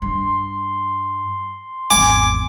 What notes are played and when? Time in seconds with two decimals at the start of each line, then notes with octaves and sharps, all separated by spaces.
0.02 G2 C6
1.90 G#1 E2 G#5 D6